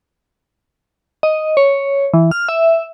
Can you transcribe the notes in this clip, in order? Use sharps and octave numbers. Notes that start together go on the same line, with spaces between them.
D#5
C#5
E3
F6
E5